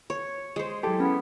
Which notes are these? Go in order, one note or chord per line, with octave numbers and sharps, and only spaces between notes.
C#5
G#3 C5
F#3 E4 G4 A4
B3 C#4 E4